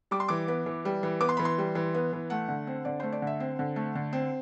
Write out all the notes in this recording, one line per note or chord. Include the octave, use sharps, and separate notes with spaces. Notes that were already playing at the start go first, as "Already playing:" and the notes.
G3 D6
C6
E3 D6
B3
E3
G3
E3
B3 D6
C6
E3 B5
C6
G3
E3
B3
E3
A3 F#5
D3
C4
D3 D5
A3 C5
D5
D3
E5
C4
D3
A3
D3
C4